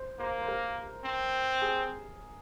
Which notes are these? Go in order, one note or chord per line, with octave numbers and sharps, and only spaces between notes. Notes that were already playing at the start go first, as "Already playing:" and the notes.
Already playing: C5
A#3 C5
C5
A#4
C4
G#4